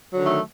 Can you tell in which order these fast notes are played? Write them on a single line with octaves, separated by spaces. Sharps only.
F#3 D3 D#3 A3